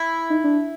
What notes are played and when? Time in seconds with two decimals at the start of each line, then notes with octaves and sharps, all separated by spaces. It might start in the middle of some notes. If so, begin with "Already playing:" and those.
Already playing: E4
0.30 D#4
0.44 D4